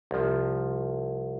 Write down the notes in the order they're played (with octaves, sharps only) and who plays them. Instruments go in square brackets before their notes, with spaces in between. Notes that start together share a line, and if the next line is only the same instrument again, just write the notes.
[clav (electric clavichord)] C2 F3